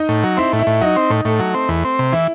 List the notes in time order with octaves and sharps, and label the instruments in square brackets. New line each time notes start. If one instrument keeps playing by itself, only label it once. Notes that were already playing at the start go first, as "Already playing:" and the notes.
Already playing: [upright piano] D#4 D#5
[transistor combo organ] A2
F#3
[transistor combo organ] C4 [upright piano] E4 E5
[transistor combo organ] A2
[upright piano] E4 E5
[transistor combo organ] A2
[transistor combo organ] F#3 [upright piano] D#4 D#5
[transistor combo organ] C4
A2
[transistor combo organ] A2 [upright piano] A3 A4
[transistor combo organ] F#3
C4
E2
C4
C3
[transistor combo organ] E3 [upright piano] E4